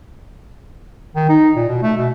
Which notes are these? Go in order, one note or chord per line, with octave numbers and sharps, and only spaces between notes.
D#3
D#4
A#2
B2
A3
B2